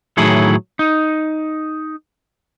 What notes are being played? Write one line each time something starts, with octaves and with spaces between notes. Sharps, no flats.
A2 D#3 F#3 E4 G#4 A4
D#4